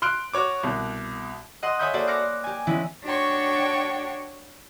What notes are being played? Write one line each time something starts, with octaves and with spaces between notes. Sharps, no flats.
C6 F6 F#6 D7
F#4 C#5 D6
C2 B2
D#5 F#5 C6 D#6
G#4 C#5 E5 B5 D#6 G6
A#3 F#4 A4 C5 D5 F#5
C6 D6 F6 F#6 A#6 C#7
G4 G#5
E3 G#3 B3 C#4 E4
D4 F#4 C#5 G5 C#6